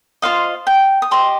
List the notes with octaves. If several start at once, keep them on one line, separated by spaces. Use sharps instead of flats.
F4 C5 D#5 F5
G5
D#6
G4 D#5 C6